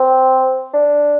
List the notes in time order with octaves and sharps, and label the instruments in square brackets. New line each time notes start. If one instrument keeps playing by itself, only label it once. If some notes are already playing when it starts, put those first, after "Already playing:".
Already playing: [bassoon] C4
D4